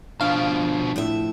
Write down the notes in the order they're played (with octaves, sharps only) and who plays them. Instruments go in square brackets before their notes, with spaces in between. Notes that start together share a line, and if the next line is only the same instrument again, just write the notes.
[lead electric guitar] B2 F3 [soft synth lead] D4 [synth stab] F5
[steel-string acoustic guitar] A2 F3 E5